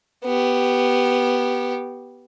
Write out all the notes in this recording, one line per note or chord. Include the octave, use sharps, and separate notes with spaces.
B3 G4